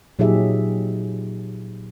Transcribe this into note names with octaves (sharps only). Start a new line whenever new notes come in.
A#2 F#3 D#4 G4 G#4 E5